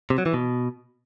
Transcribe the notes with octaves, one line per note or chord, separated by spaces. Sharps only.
C3
F#3
E3
B2